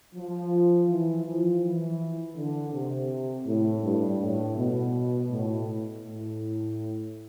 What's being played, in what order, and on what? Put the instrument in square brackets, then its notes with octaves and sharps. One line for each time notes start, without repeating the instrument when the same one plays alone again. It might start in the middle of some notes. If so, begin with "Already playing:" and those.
[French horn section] F3
E3
F3
E3
D3
C3
A2
G2
A2
B2
A2
A2